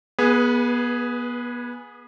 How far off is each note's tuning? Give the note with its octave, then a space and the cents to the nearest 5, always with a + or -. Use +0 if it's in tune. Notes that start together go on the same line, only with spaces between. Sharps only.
B3 -30 G#4 +0 B4 +0